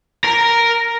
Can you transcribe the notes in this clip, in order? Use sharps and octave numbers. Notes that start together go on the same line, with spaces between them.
A#4 A#5